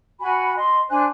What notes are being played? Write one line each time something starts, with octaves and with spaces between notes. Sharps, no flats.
F#4 G#5 B5
D#5 C6
D4 C5 G#5 F#6